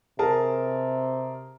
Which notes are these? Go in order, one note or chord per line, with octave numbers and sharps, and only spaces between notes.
C3 G#4 A#4 A5